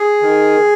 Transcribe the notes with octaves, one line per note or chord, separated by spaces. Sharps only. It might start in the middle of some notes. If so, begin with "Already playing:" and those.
Already playing: G#4
D#3